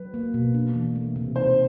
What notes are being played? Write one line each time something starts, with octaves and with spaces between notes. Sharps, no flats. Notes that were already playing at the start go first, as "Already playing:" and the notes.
Already playing: F#3 B4
A#3
B2
D4
E3
A3
C3
D#4 C5